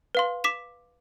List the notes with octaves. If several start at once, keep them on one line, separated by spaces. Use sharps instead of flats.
B4 F5 C6
D6 B6 E7